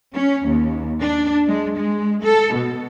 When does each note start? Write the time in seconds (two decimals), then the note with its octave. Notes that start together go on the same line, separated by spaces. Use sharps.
0.15 C#4
0.46 D#2
1.01 D4
1.47 G#3
1.77 G#3
2.23 A4
2.54 B2